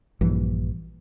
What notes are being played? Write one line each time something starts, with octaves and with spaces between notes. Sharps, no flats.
A#1 G2 E3